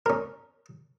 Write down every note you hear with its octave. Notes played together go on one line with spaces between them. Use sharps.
C#4 A#4